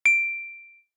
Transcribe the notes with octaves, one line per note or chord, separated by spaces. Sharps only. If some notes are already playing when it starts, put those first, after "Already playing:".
D7